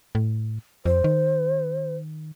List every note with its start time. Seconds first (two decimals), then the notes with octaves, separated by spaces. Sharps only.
0.15 A2
0.86 F2 C5
1.04 D#3